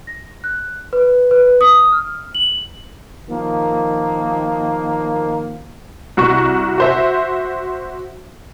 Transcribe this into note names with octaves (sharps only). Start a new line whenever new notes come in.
A#6
F#6
B4
B4
D#6
F6
F#7
D#3 F3 A#3
C2 F#4 C#6
F#4 C5 E5